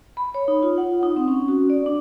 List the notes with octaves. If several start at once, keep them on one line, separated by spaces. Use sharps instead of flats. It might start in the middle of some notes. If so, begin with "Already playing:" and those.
B5
C#5
D#4
F4
F#5
D#4
C4
C#4
F#4
D5
D4